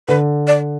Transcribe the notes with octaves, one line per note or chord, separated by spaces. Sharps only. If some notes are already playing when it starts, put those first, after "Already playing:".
D3 B4
D5